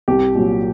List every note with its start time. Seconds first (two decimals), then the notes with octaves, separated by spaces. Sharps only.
0.08 C2 G4
0.35 A#2 F#3